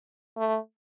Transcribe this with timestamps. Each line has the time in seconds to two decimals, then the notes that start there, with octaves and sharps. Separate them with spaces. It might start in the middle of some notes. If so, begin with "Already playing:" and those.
0.37 A3